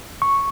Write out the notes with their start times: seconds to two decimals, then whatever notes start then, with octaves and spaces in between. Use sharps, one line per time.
0.22 C#6